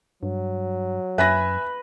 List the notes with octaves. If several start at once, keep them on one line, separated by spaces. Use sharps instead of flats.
G2 F#3
F#2 B4 E5 G#5 A#6